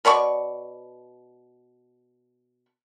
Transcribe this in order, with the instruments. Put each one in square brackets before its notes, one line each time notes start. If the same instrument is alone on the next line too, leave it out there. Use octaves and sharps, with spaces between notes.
[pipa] B2 C#5 D5 C#6